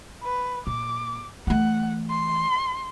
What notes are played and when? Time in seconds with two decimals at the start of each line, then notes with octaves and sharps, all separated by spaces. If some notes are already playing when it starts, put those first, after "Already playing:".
0.23 B4
0.67 A#2 D6
1.47 E3 A3 F#5
2.10 C6